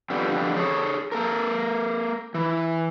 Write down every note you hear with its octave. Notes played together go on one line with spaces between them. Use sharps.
F2 D3 G3 B3
G#4 A4 C#5
A#3 A4 A#4
E3